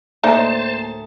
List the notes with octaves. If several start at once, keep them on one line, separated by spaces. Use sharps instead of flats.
D2 A2 A3 A#3 D#4 C5 D5 A5
A5